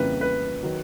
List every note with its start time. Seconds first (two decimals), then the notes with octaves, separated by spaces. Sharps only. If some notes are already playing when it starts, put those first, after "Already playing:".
Already playing: F2 C#3 E3 G3 A#3 B4
0.21 B4
0.63 D#3 F#3